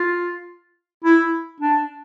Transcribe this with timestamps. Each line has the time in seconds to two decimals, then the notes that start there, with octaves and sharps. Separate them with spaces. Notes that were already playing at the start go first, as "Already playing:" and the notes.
Already playing: F4
1.04 E4
1.60 D4